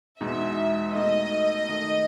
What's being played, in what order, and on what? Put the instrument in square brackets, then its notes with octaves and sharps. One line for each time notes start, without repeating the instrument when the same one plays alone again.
[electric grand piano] E2 B2 G#3 D#4 [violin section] E5
[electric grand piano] B2 A3 D#4 A4 [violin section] D#5
[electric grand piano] D#3 A3 D#4 A4